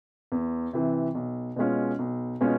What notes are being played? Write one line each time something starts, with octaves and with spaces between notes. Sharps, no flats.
E2
C3 E3
B1
B2 G#3 C#4 F4
B1
B2 G#3 C#4 F4